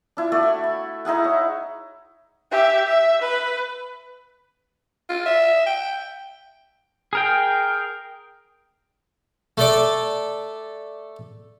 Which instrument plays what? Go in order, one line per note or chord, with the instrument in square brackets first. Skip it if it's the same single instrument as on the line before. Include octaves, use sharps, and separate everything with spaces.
[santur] D4 E4 F4
A3 F#4 A4 D5
C#6
B5
D#4 E4 G#4 F#5
C#5
[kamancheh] G4 E5
E5
B4
[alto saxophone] F4
E5
G5
[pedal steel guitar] G#4 A#4 G5
[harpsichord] A3 A4 D5